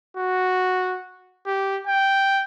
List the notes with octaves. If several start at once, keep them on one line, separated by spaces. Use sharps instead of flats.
F#4
G4
G5